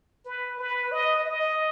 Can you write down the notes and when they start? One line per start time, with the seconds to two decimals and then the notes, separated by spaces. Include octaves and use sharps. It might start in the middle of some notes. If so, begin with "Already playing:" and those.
0.26 B4
0.59 B4
0.92 D#5
1.25 D#5